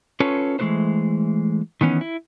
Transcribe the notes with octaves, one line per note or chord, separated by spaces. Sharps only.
C#4 F4 A4 B4 C#5
E3 G#3 A3 D#4 B4 C5
D#3 E3 B3 C#4
E4